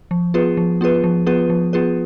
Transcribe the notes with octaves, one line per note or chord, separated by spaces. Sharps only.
F3
B3 F4 G#4 B4
F3
B3 F4 G#4 B4
F3
B3 F4 G#4 B4
F3
B3 F4 G#4 B4